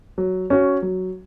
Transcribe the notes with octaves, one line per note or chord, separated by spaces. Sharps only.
F#3
C#4 F#4
F#3